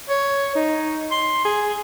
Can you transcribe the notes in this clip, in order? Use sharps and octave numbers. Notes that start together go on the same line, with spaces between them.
C#5
D#4
C6
G#4